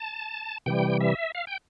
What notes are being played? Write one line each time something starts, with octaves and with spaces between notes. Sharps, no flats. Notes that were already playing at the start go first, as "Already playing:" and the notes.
Already playing: A5
C3 E3 G3 G5
E5
F5
G5